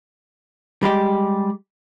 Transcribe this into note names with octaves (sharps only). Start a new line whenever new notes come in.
G3 G#3 G4